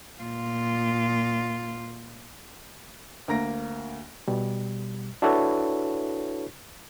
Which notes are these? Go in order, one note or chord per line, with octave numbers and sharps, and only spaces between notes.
A#2 F4
D2 A#3 A#5 A#6 D7
B2 G3
D4 E4 F#4 A4 B4 C#5